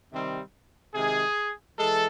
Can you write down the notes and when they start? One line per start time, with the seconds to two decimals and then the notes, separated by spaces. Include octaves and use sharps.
0.12 C3 D#3 G3 C4
0.95 C3 D#3 G#3 G#4
1.79 E3 G#3 A4